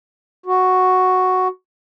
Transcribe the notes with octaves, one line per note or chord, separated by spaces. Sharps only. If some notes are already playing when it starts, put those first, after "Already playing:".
F#4